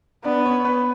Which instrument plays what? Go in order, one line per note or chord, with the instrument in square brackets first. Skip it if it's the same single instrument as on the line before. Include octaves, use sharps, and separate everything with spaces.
[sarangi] B3 [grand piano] D4 D5
[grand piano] C#4 C#5
B3 B4